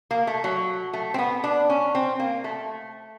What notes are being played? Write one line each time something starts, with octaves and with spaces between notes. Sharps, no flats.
A#3
A3
F#3
A3
C4
B3
D4
C#4
C4
A#3
A3